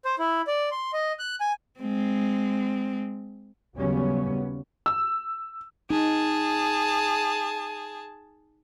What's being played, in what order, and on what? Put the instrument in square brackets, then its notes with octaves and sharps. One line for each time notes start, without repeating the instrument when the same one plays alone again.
[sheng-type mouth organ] C5
E4
D5
C6
D#5
F#6
G#5
[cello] G#3 C4
[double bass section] D#2 C#3 F#3 G3 B3 C#4
[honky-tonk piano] E6
[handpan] D#4 [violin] G#4 A5